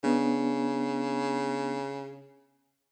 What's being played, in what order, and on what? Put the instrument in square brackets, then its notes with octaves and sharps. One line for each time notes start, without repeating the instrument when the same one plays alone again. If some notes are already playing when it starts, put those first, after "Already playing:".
[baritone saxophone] C#3 [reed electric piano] B3 D4